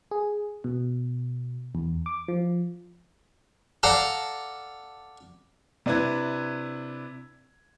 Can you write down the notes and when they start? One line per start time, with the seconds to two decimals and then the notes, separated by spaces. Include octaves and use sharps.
0.11 G#4
0.64 B2
1.75 E2
2.06 D6
2.28 F3
3.83 A4 D5 F5 F#5 A5 A#5
5.86 C3 D4 E4 B4 G#6